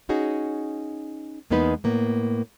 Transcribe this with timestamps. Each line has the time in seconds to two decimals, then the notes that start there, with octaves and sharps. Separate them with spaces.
0.09 C#4 D#4 F#4 G#4
1.50 E2 G#3 A#3 B3 D#4 B4
1.84 A2 A#3 B3